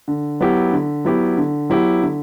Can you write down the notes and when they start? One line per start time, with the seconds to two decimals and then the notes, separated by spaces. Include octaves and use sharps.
0.08 D3
0.40 F#3 B3 E4 G4
0.72 D3
1.05 F#3 B3 E4 G4
1.37 D3
1.70 F#3 B3 E4 G4
2.02 D3